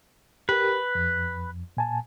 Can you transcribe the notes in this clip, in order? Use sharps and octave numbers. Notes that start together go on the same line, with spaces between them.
G4 A#4 B4
F2
A#2 G#5 A5